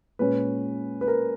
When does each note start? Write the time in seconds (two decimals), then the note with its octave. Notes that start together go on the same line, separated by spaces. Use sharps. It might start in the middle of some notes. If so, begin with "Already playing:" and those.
0.19 A#2 G#3 C#4 B4
1.01 B4
1.08 A#4